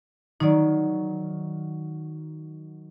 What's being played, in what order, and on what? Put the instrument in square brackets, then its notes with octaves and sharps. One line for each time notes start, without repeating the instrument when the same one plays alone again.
[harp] D#3 F#3 [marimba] D#4 D5